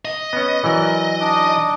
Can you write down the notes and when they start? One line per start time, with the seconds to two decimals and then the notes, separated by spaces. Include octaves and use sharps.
0.05 D#5
0.33 B3 C#4
0.64 E3 F#3 A#4 D5
1.20 D4 D#4 D6